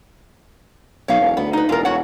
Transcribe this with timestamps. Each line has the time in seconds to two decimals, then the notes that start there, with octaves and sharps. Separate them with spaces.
1.08 B1 C#5 F5
1.21 E1
1.37 D2 B3
1.53 D#4 B4
1.69 E1 F4 A#4
1.85 F#4 C#5 F#5